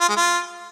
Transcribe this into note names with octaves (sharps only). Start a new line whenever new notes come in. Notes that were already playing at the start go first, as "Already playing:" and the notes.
F4
G#3
F4